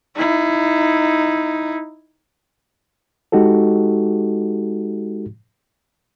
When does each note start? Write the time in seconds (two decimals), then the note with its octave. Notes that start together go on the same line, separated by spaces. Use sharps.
0.15 D#4 E4
3.32 G#3 D#4 F#4 G4 A4